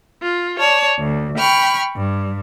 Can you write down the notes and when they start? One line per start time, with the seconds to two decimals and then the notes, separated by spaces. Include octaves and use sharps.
0.21 F4
0.58 C#5 D5 A5
0.99 D2
1.37 G5 B5 C#6 F6
1.96 G2